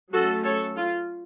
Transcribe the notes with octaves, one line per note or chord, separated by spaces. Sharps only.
F#3 A3 C#4 F#4 A4
A4 C#5
F4